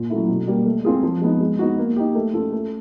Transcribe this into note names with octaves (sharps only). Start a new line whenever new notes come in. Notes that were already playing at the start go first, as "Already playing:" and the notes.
Already playing: A#2
F#3 A3 C#4 E4
B2
G3 A#3
A3
C4 F4 G#4
F3
G#3 B3 D#4
G#3
B3 D#4 F#4
A#3
D#4 G4
A3
C#4 F4 A4
A3